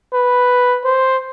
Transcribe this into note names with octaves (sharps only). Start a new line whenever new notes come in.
B4
C5